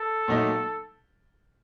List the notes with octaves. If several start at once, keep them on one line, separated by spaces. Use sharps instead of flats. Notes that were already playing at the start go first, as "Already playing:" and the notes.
Already playing: A4
A#2 F#3 A3 D#4